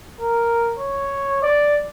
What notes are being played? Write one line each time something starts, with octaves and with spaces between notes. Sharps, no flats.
A#4
C#5
D5